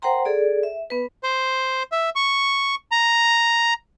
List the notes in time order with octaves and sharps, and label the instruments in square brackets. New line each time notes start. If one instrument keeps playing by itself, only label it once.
[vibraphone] A#4 C5 F#5 G5 A#5 C6
G#4 A4 D5
E5
B3 B4
[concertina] C5
E5
C#6
A#5